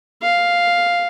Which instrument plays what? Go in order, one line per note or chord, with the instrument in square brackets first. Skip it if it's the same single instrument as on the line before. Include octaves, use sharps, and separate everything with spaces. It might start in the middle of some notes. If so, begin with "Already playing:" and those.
[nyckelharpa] F5